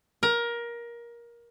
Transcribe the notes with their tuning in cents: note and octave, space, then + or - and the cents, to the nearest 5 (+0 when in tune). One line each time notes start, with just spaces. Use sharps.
A#4 +20